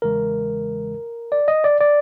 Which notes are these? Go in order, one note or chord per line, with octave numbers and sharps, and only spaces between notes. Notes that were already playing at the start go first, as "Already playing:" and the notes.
E2 C#3 E3 G#3 A#4
D5
D#5
D5
D5